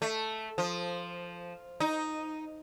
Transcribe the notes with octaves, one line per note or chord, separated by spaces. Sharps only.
A3
F3
D#4